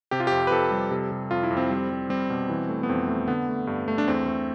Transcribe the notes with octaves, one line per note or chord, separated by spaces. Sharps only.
C3 G4
F4
F2 G4
B4
F2 A4
G3
C3
C3
F2 F4
E4
F2
C4
G3
G3
G3 C4
B2
E3
A3
B3
F2 C4
A3
D3 B3
A3
G2
A3
D4
E2 C4
A3